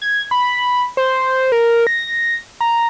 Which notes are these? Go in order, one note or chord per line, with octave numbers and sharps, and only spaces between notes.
G#6
B5
C5
A#4
A#6
A#5